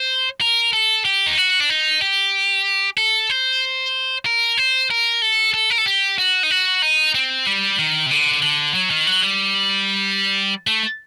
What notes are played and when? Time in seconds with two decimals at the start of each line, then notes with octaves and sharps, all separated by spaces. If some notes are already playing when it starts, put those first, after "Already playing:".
Already playing: C5
0.41 A#4
0.73 A4
1.05 G4
1.26 D#4
1.37 F#4
1.60 D4
1.70 D#4
2.01 G4
2.97 A4
3.30 C5
4.26 A#4
4.58 C5
4.90 A#4
5.22 A4
5.54 A4
5.70 A#4
5.78 A4
5.86 G4
6.18 F#4
6.43 D#4
6.51 F#4
6.82 D#4
7.15 C4
7.47 G3
7.78 D#3
8.06 C3
8.11 D3
8.43 D3
8.74 F#3
8.90 D#3
9.07 F#3
9.23 G3
10.67 A3